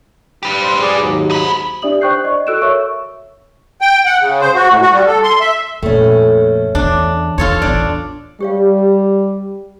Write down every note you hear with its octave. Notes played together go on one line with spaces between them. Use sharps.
G4 B4
C5
G#4 D5
D#2 G#2 F#3
D#4 B5
D4 G4 D5 E5 D#6 F#7
C5 G5 C#6 F#6 G6 C7
D5 D#5 C#6
F#4 A4 E6 F#6 D7 E7
A#4 C#5 E5 C#6 E6
G5
F#5
C#3
C5
F#4
A2
F#4
G3
A4
C6
E5
F2 A#2 A3 C#4
E2 D4
E2 F4 A4 C#5
A1 E2 D4 D5
G3 G4 C#5 F5